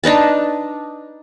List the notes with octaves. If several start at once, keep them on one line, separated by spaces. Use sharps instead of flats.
D4 D#4 B4 A5